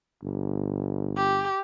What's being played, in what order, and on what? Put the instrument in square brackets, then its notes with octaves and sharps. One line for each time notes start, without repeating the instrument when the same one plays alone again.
[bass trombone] G1
[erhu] G4